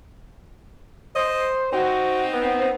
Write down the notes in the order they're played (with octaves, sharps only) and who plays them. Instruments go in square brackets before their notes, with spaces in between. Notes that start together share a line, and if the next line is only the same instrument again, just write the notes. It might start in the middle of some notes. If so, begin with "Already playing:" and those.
[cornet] C5 [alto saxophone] D#5
[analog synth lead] C4 [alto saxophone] D#4 [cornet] F#4
[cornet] B3